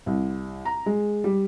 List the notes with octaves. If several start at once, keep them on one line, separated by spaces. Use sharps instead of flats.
C2
A#5
G#3
G3